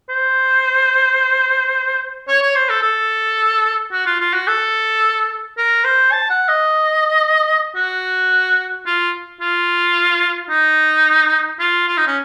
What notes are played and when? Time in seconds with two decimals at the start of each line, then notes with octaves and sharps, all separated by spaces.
0.09 C5
2.28 C#5
2.42 C#5
2.55 C5
2.69 A4
2.82 A4
3.92 F#4
4.06 F4
4.20 F4
4.33 F#4
4.47 A4
5.57 A#4
5.84 C5
6.12 A5
6.30 F#5
6.48 D#5
7.76 F#4
8.86 F4
9.41 F4
10.50 D#4
11.60 F4
11.87 F4
11.97 D#4
12.07 C#4